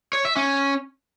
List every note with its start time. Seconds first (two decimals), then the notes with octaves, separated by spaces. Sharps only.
0.13 C#5
0.25 E5
0.37 C#4